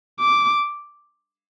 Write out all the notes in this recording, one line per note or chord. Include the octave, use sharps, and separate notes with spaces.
D6